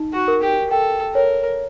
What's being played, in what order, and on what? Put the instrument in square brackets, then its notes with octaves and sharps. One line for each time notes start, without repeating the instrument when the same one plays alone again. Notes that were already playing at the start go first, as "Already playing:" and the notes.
Already playing: [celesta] D#4
[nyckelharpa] F#4
[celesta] A#4
[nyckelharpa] G4
[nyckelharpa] A4 [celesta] G5
[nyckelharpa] A#4 [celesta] C#5